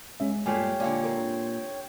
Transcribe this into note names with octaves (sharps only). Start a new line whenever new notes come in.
G#3 C#4 E5
G2 A#2 A3 G4 C#5 F5 G5 G#5
A#2 D3 C#4 D5 F5 A5
C4 A4 A#4